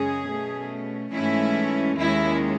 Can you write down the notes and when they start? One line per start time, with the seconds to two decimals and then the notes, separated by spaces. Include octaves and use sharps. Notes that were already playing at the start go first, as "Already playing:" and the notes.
Already playing: F#2 C#3 G#3 C#4 G#4
0.26 B2 A3 C#4
1.12 G#2 E3 A3 C#4 E4
1.98 D#2 D#3 G#3 C#4 E4